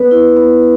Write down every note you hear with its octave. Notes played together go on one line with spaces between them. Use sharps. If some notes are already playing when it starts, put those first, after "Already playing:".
Already playing: B3 B4
E4
B3